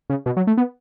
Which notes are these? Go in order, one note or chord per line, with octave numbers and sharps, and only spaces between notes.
C#3
B2
F#3
A3
B3